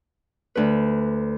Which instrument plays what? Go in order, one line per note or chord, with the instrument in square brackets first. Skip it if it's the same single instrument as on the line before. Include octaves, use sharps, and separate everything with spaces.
[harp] D2 D4 B4